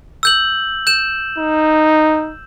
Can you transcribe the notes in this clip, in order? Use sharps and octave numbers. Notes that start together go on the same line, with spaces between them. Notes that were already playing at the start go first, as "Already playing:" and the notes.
E6 G6 F#7
G6 E7
D#4